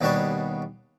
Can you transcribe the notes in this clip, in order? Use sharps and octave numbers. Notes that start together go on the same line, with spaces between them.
D#2 B2 G3 D4 C#5 A5